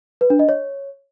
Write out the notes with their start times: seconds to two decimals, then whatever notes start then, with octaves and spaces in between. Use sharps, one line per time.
0.21 B4
0.30 D4
0.39 D#5
0.49 C#5